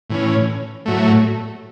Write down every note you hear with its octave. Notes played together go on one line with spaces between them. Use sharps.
A2 E3 C#4
A2 F#3 A3